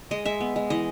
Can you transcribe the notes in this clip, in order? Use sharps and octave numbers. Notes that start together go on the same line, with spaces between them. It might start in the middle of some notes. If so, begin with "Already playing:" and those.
G#3 D#5
G#3 E5
B3
G#3
E3 D#5